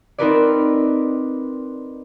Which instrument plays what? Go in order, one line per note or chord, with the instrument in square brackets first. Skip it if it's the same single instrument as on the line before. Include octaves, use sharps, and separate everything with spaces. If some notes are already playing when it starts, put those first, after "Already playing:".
[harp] C4 D#4 F4 A#4 B4 D5